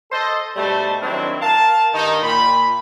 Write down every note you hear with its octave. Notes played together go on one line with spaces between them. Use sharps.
A4 C5 D#5
G#2 B2 G3 A3 C5 A5
D#3 F#3 C4 D4 E4
A#4 F5 A5
G2 D#3 D#4
A#2 B5